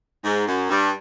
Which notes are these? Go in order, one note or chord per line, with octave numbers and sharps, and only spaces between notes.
G#2
F#2
G2